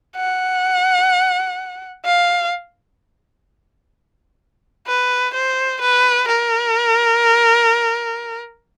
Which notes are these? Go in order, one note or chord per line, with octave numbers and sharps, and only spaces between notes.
F#5
F5
B4
C5
B4
A#4